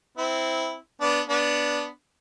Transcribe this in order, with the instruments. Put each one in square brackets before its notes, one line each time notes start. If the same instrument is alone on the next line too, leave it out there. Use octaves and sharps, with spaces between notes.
[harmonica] C4 E4
B3 D4
B3 D4